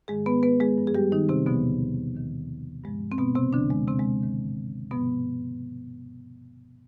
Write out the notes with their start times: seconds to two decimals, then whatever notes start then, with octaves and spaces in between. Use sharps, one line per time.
0.08 G#2 D#3 G#3 G#4
0.26 B3 B4
0.43 B3 B4
0.60 G#3 G#4
0.78 G2 F3
0.87 G#4
0.95 G3 G4
1.12 D#3 D#4
1.29 C3 C4
1.46 D#2 B2 D3 F3 B3
2.15 D#2 D#3
2.84 G2 F3 G#3
3.12 C4
3.18 B2 B3
3.35 C3 C4
3.53 D#2 D3 F3 D4
3.71 G#3
3.88 C3 C4
4.00 G#3
4.23 G#2 D#3
4.91 G2 B2 F3 B3